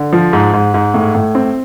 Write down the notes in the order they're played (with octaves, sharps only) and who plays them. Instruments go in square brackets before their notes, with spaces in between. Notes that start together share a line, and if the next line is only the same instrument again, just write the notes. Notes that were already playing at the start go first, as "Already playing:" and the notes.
Already playing: [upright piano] D3
F3
G#2
G#2
G#2
A2
A2
C4